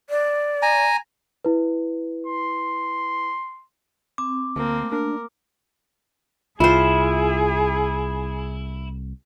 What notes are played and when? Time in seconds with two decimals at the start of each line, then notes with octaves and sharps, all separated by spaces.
0.10 D5
0.62 G#5 A#5
1.45 E4 B4
2.27 C6
4.18 C4 D6
4.56 D2 A3 A#3 C4
4.92 D4 A#4
6.60 C2 E4 F4 G#4 C5